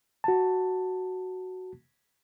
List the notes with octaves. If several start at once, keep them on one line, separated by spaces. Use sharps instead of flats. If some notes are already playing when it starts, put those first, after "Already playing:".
F#4 A5